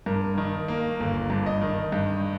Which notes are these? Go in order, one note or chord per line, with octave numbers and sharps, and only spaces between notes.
G2 A#4
D#3
A#3
G1
G2
D#5
D#3
G2